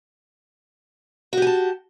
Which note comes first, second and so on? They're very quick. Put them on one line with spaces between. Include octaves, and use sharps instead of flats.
F#4 G4 G#5 A5